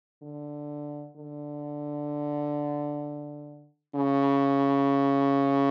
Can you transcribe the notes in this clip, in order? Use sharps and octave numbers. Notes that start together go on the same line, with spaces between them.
D3
D3
C#3